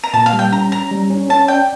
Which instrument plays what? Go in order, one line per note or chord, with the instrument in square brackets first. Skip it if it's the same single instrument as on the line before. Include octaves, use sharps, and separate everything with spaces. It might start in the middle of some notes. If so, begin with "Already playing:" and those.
[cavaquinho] A#5
[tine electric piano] A#2 [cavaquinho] A5
[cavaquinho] F5
[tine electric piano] G3
[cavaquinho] G5
[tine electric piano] C#4 [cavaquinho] A#5
[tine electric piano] C#4 [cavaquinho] A#5
[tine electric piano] G3
C#4
[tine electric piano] C#4 [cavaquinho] A5
[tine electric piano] D5 [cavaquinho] G5